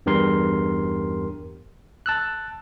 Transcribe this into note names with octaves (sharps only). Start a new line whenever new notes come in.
E2 G2 G4 A#4 C6
A5 E6 F#6